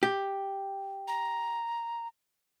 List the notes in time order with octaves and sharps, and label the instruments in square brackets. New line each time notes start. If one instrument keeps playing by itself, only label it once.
[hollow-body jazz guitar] G4
[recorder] A#5